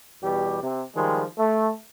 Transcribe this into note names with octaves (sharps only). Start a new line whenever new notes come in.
E2 B2 G3 G4
C3
D#3 F3 G3 G#3
A3